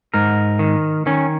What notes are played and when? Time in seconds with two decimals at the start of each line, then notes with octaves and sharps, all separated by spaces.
0.14 G#2 A#4
0.59 D#3
1.06 D#3 C#4